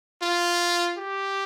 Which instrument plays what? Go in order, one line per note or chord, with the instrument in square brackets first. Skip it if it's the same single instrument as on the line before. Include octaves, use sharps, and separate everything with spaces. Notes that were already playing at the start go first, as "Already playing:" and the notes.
[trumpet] F4
G4